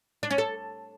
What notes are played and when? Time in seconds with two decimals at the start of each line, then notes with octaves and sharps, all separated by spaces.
0.23 D4
0.31 C#4
0.38 A4